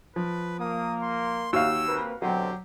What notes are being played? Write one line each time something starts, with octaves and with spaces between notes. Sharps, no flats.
F3 B4
A#3 D#6
C6
D#2 F#4 F5 E6
A#3 C4 B4
B2 D3 F#3 C4 G4